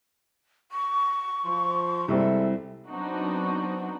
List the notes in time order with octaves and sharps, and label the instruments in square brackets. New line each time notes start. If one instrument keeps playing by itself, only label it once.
[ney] C#6
[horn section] F3 C6
[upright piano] C2 G3 C4 [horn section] G#3 A4 E5
[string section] F#3 B3 C4 D4 D#4 F#4